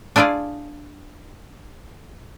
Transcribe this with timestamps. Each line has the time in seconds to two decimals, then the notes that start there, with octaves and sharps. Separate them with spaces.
0.16 D4 E4 F4 G#4 D5